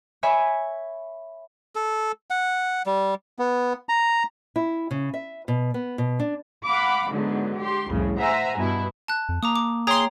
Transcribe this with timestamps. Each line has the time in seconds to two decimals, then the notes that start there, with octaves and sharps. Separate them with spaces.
0.23 C#5 E5 G#5 B5
1.76 A4
2.30 F#5
2.86 G3
3.39 B3
3.89 A#5
4.56 E4
4.91 C#3
5.14 E5
5.48 B2
5.74 B3
5.98 B2
6.19 D4
6.66 F5 F#5 B5 D6
7.10 G#2 D3 F#3 B3
7.59 G4 C6
7.89 C2 F2 A2 C#3
8.18 C5 E5 F#5 G#5 A#5
8.57 G2 B2 E4
9.08 A5 F#6
9.29 F2
9.43 A#3 A#5 D6 D#6
9.56 D6
9.87 G#4 C#5 G5 A#5 C6